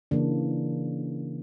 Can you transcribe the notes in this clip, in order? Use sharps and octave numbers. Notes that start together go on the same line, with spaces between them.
C#3 E3 A#3 D4